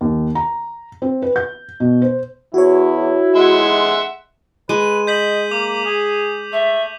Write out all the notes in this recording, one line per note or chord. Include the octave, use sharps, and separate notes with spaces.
D#2
A#5
C4
B4
G6
B2
C5
E2 E4 F#4 C#5
G#3 E5 F#5 C6
G#3 B4 D#7
D#5 G6 B6 F#7
A#3 D6
G#4
A3 E5